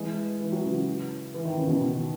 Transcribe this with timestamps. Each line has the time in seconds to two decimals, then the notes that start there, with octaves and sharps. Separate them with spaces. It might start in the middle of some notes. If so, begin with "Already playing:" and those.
Already playing: E3 G#3
0.41 E3
0.52 F#3
0.64 C#3 E3
1.34 E3
1.45 D#3
1.57 C#3
1.68 B2 D#3